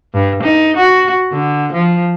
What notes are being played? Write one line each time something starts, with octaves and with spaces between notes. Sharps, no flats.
G2
D#4
F#4
D3
F3